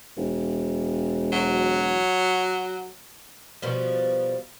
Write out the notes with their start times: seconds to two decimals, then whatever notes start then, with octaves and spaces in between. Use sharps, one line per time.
0.17 E1
1.32 F#3
3.62 B2 F3 G3